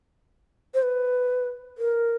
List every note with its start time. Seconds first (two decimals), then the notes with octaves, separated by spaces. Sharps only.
0.74 C5
0.83 B4
1.78 A#4